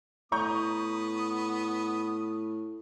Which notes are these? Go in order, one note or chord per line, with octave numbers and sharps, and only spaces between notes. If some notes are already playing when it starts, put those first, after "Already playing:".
A2 B3 A#5 C#6 D#6 G6